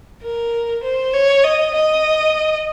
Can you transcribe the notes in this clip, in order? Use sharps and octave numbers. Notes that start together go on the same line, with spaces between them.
A#4
C5
C#5
D#5
D#5